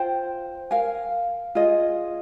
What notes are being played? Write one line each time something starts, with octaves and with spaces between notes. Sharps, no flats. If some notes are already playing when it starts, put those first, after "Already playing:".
Already playing: F4 C5 G5
A#4 F5 G#5
F4 G#4 D#5